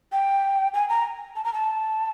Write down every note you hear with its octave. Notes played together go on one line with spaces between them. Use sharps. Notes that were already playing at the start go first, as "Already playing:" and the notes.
G5
G#5
A#5
A5
A#5
A5